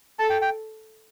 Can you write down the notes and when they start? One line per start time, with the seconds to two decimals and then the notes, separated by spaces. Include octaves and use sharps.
0.19 A4 A5
0.30 G5
0.42 G5